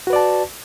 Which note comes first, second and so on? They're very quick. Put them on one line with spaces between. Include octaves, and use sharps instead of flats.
F#4 B4 D5 A5